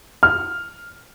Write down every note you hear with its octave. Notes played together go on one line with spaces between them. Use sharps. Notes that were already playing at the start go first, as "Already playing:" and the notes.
F6